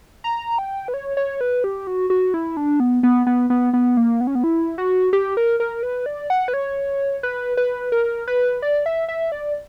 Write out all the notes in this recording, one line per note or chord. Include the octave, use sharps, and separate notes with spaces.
A#5
G5
B4
C#5
C#5
B4
G4
F#4
F#4
E4
D4
B3
B3
B3
B3
B3
A#3
B3
C#4
B3
E4
F#4
G4
A#4
A#4
B4
D5
F#5
B4
C#5
B4
B4
A#4
B4
D5
E5
E5
D5